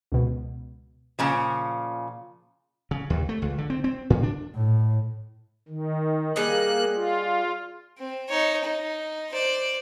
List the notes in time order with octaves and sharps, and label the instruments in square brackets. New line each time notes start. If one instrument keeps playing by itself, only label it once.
[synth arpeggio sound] C#2 B2
[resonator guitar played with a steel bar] A#2 C#3 F3
[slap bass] C#3
D#2
A3
C#2
D3
C4
C4
A2
D4
[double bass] A2
[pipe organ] D#3
[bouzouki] G3 G#4 D#5 [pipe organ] A#3 F#6
[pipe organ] F4
[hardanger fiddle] C4
D#4 C#5
D#4
C5 D5